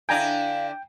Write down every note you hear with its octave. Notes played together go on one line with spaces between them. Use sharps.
D3 D4 E4 F5 G5 G#5 A#5